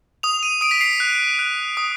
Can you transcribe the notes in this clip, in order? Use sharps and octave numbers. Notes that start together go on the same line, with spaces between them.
D#6 F7
D#7
D#6 D7
B6
C7
F#6
F#6
D#6